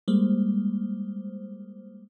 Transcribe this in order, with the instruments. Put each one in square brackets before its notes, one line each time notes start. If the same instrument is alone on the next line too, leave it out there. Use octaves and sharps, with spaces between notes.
[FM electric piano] G3 G#3 A#3 C5